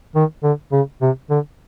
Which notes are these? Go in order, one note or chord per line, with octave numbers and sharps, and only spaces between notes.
D#3
D3
C#3
C3
D3